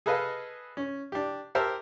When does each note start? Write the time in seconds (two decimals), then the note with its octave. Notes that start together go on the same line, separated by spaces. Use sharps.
0.06 G#4 A4 B4 D#5 F5
0.77 C#4
1.12 D4 G4
1.55 G4 A#4 C5 E5 A5